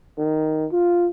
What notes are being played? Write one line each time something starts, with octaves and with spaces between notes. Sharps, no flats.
D#3
F4